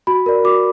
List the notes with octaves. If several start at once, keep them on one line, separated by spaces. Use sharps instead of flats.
F#4 B5
A#4 D5
F#4 D6